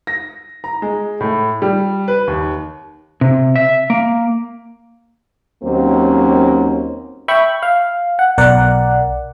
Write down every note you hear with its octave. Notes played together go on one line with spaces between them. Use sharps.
A#6
A#5
G#3
A2
G3
B4
D#2
C3
E5
A#3
D#2 F#3 A#3 C4 C#4
E5 G5 B5 C#6
F5
F#5
B1 A#4 D5 F#5